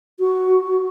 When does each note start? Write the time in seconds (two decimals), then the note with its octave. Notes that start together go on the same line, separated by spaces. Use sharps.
0.19 F#4